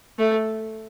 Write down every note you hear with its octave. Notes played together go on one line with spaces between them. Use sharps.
A3